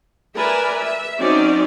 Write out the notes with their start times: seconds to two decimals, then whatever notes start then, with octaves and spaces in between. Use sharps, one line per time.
0.34 A#4 B4 D5 E5 G#5
0.79 E5
1.19 F#3 C4 C#4 D#4 C5 D5